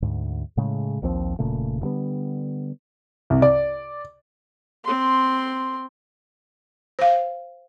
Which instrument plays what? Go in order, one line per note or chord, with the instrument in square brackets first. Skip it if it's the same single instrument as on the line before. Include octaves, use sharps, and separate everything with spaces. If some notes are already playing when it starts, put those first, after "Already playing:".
[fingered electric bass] D2 G#2
A2 C#3 G#3
A#1 D#2 F3 C4
E1 A#2 C#3 A3
G2 D3 G3 B3
[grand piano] C2
D5
[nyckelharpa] C4 C6
[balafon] C5 F5